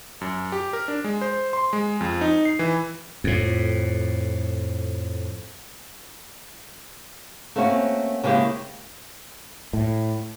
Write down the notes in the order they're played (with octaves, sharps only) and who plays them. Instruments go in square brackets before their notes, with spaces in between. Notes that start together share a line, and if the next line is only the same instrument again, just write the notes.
[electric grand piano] F#2
G4
A#4
D4
G#3
C5
C6
G#3
F2
D#4
C7
E3
[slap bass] F2 A2
[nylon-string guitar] A3 A#3 C4 C#4 F#4
C#3 G#3 A#3 E4 G4
[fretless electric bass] A2